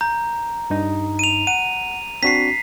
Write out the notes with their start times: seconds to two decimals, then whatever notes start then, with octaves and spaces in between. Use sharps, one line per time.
0.01 A#5 G6
0.70 G2 D#4
1.19 D#7 F7
1.47 F#5 D#7
2.23 C4 D4 F#4 B6 C7